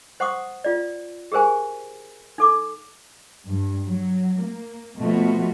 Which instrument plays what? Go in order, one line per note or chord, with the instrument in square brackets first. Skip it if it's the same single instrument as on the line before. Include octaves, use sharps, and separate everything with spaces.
[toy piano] C5 F#5 C6 C#6 D#6
F4 D5
G4 G#4 A#4 C5 G#5
D#4 A4 D6
[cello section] G2
F#3
A#3
B2 F3 A3 B3 F4 F#4